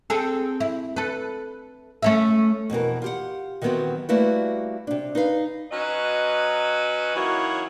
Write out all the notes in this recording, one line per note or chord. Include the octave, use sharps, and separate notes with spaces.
C4 G#4 A4
E4
A4 B4
A3 C#4 E5
F2 B2 E3 A#4
F4 G4 F#5
D#3 E3 F#3 B3 C4 F#4
G3 A3 A#3 E4 F#4 B4
C3 D4
D#4 B4 F5
F#3 C#4 F#4 B4 D#5
E3 F#3 A#3 C#4 D#4 F#4